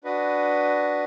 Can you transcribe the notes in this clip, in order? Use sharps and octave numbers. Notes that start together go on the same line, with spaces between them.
D4 F#4 B4 D#5